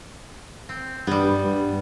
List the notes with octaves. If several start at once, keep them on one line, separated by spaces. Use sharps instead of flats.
C4
G2 G3 B3
G2